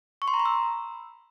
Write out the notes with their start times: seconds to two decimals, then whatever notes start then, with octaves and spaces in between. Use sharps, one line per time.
0.22 C#6
0.28 C6
0.34 A#5
0.40 B5
0.46 E6